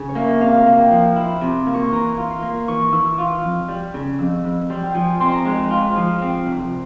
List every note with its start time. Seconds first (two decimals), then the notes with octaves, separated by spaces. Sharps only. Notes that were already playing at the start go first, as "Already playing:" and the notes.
Already playing: C#3 G#5
0.09 C#5
0.15 A#3 E5
0.41 C3 F5
0.66 A#3
0.79 G5
0.91 F3
1.16 E4
1.41 C3
1.67 A#3
1.74 C#6
1.83 C6
1.92 E3 A#5
2.18 F4
2.30 C6
2.42 A#3
2.68 E3 C#6
2.93 E3 E6
3.18 F4 F6
3.44 F2
3.69 G3
3.94 C#3
4.19 F2 E6
4.44 F2
4.70 G3 C6
4.83 G5
4.95 F3 G#5
5.20 C4 C6
5.32 A#5
5.45 G#3
5.71 F4
5.96 F3
6.22 C4
6.47 C2